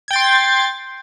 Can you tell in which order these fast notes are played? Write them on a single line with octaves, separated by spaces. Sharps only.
G#6 G5 A6 C6